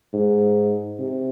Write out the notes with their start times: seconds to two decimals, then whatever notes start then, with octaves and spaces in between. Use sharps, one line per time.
0.13 G#2
0.99 C3